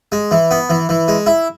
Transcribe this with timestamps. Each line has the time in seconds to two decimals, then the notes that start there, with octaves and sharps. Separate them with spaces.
0.12 G#3
0.31 E3
0.51 B3
0.69 E3
0.89 E3
1.08 G#3
1.26 E4